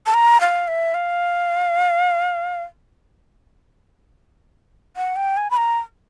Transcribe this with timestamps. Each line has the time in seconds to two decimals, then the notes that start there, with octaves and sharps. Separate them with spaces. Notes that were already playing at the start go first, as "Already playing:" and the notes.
0.06 A5
0.14 A#5
0.41 F5
0.68 E5
0.94 F5
4.97 F#5
5.16 G5
5.37 G#5
5.51 B5
5.57 A#5